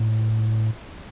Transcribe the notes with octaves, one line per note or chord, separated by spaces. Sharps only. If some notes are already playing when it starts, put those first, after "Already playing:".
Already playing: A2